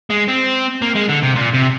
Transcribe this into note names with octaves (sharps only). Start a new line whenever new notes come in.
G#3
C4
A#3
G#3
D3
C3
A#2
C3